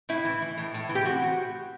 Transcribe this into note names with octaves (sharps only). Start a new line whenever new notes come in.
A2 E4
E3
E3
A2
A2
E3
G4
C4 F#4
A2